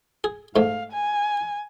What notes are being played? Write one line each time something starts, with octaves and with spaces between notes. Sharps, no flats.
G#4
G#2 A3 F5
G#5